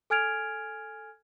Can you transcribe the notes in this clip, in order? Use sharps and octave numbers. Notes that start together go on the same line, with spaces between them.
A4 G#5 F6 G#6 D7 F7